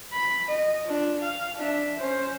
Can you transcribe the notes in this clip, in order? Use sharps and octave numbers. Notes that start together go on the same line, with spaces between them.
B5
D#5
D4 F4
F5
D4 E5
C#4 C5